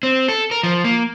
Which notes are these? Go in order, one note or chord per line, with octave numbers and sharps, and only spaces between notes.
C4
A4
A#4
F3
A#3